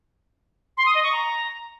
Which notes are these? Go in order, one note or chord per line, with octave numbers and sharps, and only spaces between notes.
C6
D#6
D#5
C#6
A#5